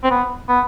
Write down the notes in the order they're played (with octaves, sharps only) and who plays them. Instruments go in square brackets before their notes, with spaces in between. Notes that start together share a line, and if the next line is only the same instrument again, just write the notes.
[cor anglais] C4
B3
B3